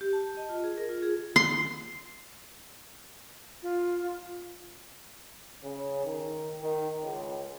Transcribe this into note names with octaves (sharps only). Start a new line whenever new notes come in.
G4
A5
D#5
F4
G#4
A#4
F4
G#4
C6
F4
C#3
D#3
D#3
C#2